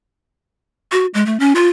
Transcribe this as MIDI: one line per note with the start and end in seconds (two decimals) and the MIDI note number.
0.92 1.06 66
1.14 1.24 56
1.26 1.40 57
1.40 1.53 61
1.55 1.69 65